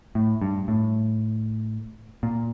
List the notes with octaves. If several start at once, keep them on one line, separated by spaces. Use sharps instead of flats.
A2
G2
A2
A#2